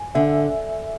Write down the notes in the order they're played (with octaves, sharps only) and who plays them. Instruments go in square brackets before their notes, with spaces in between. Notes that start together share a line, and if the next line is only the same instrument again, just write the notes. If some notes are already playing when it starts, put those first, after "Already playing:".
Already playing: [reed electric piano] G#5
[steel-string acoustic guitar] D3 [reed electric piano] E5